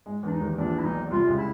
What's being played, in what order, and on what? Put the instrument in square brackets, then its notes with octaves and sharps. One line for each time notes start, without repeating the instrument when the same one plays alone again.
[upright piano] G#2 G#3
E2 E3
[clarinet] D4
D#4
[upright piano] D#2 D#3
[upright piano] A#1 A#2 [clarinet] D4
[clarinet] E4
[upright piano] B1 B2 [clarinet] D#4
[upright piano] C2 C3 [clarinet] F4
[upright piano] C#2 C#3
[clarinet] E4